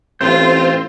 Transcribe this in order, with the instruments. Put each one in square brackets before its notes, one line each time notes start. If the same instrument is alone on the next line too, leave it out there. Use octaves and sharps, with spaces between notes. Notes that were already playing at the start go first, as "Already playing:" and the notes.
[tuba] A1 [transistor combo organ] C4 [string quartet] F4 [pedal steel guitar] C5 G6